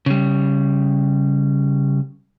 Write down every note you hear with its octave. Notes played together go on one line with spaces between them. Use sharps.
C#3 G3